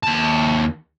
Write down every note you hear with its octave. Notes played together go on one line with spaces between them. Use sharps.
D#2 A5